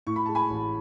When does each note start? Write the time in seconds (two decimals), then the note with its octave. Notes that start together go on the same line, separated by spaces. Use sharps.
0.07 A2 C#6
0.16 B5
0.26 G#3 A5
0.35 G#5 B5
0.50 A1